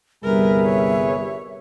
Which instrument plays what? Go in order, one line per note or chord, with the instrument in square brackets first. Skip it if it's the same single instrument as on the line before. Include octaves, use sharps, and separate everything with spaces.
[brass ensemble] G1 C2 G3 [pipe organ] G#4 B4 [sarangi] A#4 [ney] E5
[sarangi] C#5